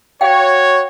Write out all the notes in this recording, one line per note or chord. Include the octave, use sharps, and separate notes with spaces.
F#4 C#5 F5 G5